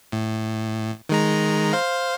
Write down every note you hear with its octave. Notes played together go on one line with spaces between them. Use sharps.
A2
D#3 G#3 A#5
C5 F5